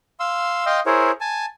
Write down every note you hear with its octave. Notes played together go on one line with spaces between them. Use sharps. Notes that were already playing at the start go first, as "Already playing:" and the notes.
F5 C6 E6
D#5 F5 G5 C6
E4 G#4 A#4 C5 C#5
G#5 A5